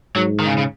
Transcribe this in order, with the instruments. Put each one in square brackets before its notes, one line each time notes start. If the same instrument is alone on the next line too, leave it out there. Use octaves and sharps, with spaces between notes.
[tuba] G#2 [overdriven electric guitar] F#3
[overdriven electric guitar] D#3
C#3
C#3